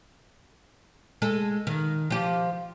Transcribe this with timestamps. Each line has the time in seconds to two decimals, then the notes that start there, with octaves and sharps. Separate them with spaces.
1.22 G#3 A4
1.67 D#3
2.10 F3 G4